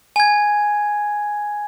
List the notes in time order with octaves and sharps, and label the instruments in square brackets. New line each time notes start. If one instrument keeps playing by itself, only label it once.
[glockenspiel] G#5 G#6